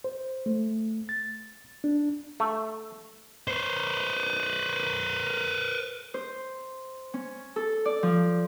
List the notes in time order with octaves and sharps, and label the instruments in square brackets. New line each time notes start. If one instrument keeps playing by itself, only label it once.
[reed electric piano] C5
A3
A6
D4
[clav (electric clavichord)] A3
[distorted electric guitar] B4 C5
[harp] C5
C#4
A4
D5
F3